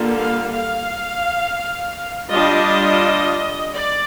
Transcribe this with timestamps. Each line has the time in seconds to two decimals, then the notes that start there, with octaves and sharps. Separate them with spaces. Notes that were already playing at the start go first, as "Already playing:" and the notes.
Already playing: D3 G3 A#3 F4
0.18 F5
0.53 F5
2.32 G3 D4 F4 D#5
3.74 D5